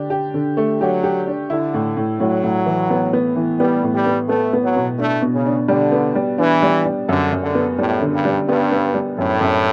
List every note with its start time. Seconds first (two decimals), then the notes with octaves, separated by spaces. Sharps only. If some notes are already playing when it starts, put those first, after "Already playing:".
Already playing: D3 D4 G4
0.10 G4
0.34 D3
0.57 A3
0.80 F#3 G4
1.04 G4
1.27 D4
1.50 D3 E4
1.74 A2
1.97 A2
2.20 A2 F#3
2.43 A2
2.66 E3
2.90 B3
3.13 B3
3.36 E3
3.60 G3 B3
3.83 A2
3.94 G3
4.06 B3
4.29 A3 B3
4.53 B3
4.64 F#3
4.76 B2
4.99 A3 D4
5.22 B2
5.34 C#3
5.46 D4
5.68 D3 G3
5.92 B3
6.15 G3
6.38 E3 D4
6.62 G3
6.86 G3
7.09 F#2 D3
7.32 F#2
7.43 D3
7.55 B3
7.78 A2 G3
8.01 D3
8.13 G2
8.25 G3
8.49 G2 B3
8.72 B3
8.94 G3
9.18 F#2 A2
9.41 F#2